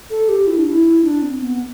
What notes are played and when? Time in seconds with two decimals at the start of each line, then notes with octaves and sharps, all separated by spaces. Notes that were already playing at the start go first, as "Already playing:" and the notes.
0.10 A4
0.29 G4
0.47 E4
0.58 D4
0.68 E4
1.04 D4
1.22 C4
1.41 B3